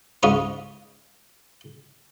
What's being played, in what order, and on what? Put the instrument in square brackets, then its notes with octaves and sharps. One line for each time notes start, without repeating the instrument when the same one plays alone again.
[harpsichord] C#2 G#2 F4 C#6 D#6